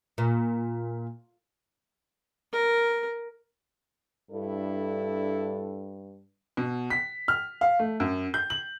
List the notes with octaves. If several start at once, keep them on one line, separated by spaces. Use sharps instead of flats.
A#2
A#4
G2 D4 E4 A4
B2
B6
F6
F5
A3
F#2
G6
F#7